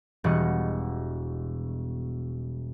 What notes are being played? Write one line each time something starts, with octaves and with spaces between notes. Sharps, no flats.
E1 B2 G3 D#5 C#6